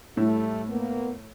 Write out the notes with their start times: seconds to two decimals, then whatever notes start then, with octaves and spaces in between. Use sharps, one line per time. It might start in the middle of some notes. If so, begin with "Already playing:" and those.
0.17 A2 G3 A3 E4
0.69 A#3 B3